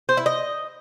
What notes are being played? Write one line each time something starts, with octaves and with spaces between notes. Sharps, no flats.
C5
E4
D#5